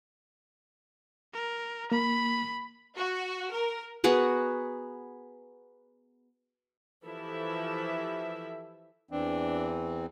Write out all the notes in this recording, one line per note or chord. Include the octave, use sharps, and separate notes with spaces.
A#4
A#3 B5
F#4
A#4
B3 F#4 G#4 A#4
E3 F3 E4 G4 A4 E5
E2 E3 C4 D4